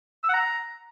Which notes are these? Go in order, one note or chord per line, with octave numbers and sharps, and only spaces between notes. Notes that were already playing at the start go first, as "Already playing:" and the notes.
E6
F#5
A#5